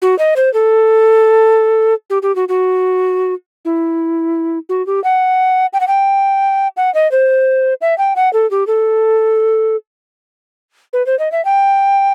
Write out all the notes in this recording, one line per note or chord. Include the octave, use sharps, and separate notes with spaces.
F#4
D#5
C5
A4
G4
G4
F#4
F#4
E4
F#4
G4
F#5
G5
F#5
G5
F#5
D#5
C5
E5
G5
F#5
A4
G4
A4
B4
C5
D#5
E5
G5